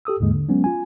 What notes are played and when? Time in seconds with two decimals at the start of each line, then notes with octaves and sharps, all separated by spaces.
0.05 G4 A4 D#6 E6
0.20 D#2 G#2 D3 G#3 A#3
0.34 D3
0.49 F#3 G#3 B3 C#4
0.64 F4 G#5